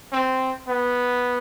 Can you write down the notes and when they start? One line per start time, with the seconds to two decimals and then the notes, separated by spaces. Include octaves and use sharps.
0.12 C4
0.68 B3